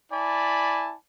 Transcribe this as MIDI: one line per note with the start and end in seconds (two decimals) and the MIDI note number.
0.12 0.95 64
0.12 0.95 74
0.12 0.95 80
0.12 0.95 81
0.12 0.95 83